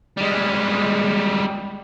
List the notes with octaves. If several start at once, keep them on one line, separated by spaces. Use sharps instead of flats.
G3 G#3